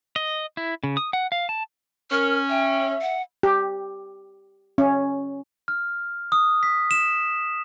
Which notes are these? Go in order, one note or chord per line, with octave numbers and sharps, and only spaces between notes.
D#5
E4
C#3
D#6
F#5
F5
A5
C#4 A#4 F6
E5 G5
F#5
G4
C#4
F6
D#6
B6
E7